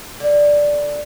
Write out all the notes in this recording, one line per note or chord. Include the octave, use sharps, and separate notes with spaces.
D3